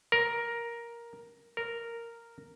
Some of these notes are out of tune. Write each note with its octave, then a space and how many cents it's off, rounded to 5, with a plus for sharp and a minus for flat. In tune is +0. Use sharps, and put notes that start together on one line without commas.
A#4 +10
A#4 -5